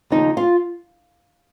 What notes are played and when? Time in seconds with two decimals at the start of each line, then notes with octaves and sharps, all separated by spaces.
0.10 D#2 C#3 F3 D#4
0.37 F4